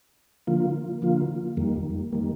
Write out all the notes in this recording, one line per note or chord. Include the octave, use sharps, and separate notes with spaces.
D3 F3 A#3 F4
D3 F3 A#3 F4
F2 D#3 G3 A#3
D#3 G3 A#3